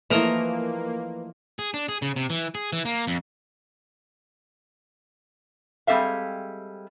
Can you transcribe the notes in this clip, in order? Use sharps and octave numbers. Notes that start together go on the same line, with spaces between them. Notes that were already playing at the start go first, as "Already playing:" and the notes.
E3 F3 A3 A#3 A#4 B4 D#5
G#4
D4
G#4
C#3
C3
E3
G#4
E3
A#3
F2
G3 G#3 C4 A4 E5 F5